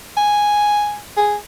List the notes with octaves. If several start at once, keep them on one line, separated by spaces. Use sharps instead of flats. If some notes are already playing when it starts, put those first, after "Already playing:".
G#5
G#4